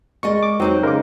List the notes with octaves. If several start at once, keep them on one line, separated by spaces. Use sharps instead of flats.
G#3 A#4 D5 D#5 C#6
D6
F#3 C4 D#4 B4 C5
C#3 G#3 A#4 D6